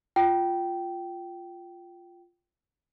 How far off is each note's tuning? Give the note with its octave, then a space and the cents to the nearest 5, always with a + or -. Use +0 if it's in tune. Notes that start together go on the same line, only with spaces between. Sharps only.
F4 +0 G5 -15